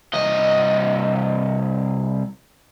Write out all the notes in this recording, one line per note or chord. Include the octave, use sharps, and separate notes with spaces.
C2 D#5